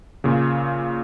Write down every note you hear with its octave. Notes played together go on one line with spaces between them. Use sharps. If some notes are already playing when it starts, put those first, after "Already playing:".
A#2 C#3